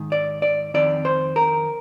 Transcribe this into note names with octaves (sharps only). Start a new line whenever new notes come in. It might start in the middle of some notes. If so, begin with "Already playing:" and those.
Already playing: G#2 D#3
D5
D5
F2 D#3 D5
C5
A#4